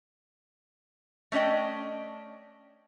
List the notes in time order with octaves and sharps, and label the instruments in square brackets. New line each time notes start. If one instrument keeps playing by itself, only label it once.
[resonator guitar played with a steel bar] A3 C#4 D4 D#5 G5